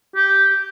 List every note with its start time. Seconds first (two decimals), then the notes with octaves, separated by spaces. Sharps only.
0.15 G4